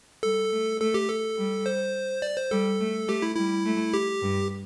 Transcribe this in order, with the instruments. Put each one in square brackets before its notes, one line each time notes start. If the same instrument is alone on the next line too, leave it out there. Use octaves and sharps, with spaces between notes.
[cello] G3 [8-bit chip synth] A4
[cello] A3
[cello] A3 [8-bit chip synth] A4
[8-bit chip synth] G4
A4
[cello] G3
[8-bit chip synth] C5
D5
C5
[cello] G3 [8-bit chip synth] A4
[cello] A3
[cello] A3 [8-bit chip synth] G4
[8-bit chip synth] E4
[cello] G3 [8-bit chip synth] E4
[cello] A3
[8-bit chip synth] G4
[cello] G2